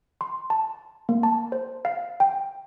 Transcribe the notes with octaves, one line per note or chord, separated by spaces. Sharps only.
C6
A5
A#3
A5
C5
F5
G5